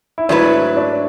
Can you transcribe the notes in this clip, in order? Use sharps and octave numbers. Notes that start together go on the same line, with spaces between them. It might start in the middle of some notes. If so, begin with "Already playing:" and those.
E4
G#2 F#3 A3 D4 E4 B4
D4